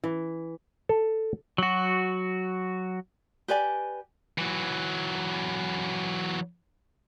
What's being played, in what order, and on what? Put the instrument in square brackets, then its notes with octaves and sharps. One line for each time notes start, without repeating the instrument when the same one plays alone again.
[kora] E3
[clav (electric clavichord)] A4
[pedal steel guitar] F#3 F#4
[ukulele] G4 B4 D5 G#5
[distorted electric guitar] E3 F#3